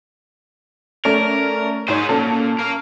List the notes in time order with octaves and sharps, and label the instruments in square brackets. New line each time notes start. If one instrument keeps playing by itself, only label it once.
[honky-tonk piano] A3 C#4 D5 [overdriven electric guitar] A#4
[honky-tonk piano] G#2 C#5 [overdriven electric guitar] G#4 C5
[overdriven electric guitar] A#2 [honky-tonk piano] C#4 A4
[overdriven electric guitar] A#4 F5